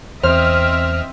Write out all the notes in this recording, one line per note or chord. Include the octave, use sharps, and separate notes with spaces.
E2 C4 C5 D#5 E5 F6